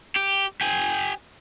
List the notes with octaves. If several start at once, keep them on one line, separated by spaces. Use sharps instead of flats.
G4
G4 G#5